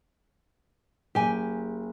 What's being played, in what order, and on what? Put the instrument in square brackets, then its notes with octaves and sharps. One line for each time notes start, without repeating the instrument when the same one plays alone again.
[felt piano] F#1 [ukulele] G4 G#5